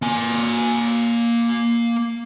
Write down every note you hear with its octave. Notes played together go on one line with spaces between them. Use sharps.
A#3 G#5